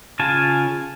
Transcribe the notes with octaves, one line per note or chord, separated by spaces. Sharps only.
C#3 F4 G#5 A5